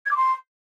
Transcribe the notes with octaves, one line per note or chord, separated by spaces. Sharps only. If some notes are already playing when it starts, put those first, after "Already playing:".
G#6
D6
C6